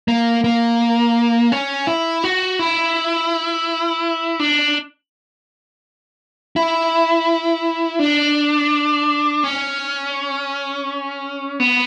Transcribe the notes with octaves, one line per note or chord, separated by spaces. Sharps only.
A#3
A#3
C#4
E4
F#4
E4
D4
E4
D4
C#4
B3